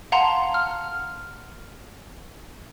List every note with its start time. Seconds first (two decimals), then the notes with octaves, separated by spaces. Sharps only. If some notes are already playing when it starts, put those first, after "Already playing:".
0.12 F5 F#5 A5 A#5 C6
0.54 F6